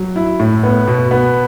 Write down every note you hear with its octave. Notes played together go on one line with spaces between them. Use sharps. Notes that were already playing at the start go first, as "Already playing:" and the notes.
Already playing: F#3
E4
A2
B3
B2
B3